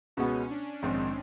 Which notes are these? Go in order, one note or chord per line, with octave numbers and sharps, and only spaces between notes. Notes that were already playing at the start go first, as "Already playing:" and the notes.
C#2 B2 G#3 B3 C#4
D4
A#1 G#2 D#3 C4